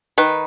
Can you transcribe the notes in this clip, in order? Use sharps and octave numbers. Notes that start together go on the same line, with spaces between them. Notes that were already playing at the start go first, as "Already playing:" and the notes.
D#3 B4